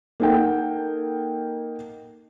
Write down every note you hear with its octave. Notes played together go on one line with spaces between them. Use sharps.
A#3 D#4 A4 F#5 G5